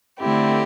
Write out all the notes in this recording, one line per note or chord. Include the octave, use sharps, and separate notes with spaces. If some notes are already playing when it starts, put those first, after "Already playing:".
D3 A3 C4 E4 G4